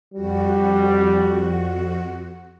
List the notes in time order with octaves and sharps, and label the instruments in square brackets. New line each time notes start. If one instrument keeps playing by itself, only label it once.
[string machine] F2 F#4 [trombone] G3